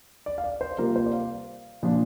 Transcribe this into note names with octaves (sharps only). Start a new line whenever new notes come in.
D5
F5
D5
C5
C3 G3 A#3 F4 A#4
C5
D5
F5
A#2 F3 D4 F4